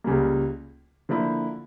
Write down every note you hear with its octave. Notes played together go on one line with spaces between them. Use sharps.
C#2 C#3 G3 A#3
D3 F3 A#3 E4